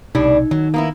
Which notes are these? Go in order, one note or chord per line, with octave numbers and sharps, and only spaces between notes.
B1 A2 C3 G3 D4 D#4
D#3 F#3
A#3 B3 E4